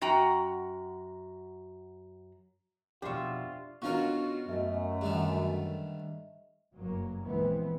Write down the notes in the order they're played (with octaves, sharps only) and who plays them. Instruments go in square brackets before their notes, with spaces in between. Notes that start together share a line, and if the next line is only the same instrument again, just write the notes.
[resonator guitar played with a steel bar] F#2 F#4 G5 A#5
[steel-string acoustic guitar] F2 B2 [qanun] D4 E5 [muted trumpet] F4 [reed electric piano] G4 C6 C#6
[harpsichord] B2 C#4 A#4 [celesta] D4 F5 C#6 [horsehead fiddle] F4 F#4
[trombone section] F#2 [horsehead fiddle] A3 [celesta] D#5 E5
[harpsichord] G2 D3 D#3
[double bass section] F#1 G2 F#3 A#3
A#1 E3 G#3 B3 C4